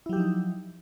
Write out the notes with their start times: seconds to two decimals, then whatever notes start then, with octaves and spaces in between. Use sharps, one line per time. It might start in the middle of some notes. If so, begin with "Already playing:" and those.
0.06 E4
0.09 F#3
0.13 G4
0.16 F3
0.19 D#4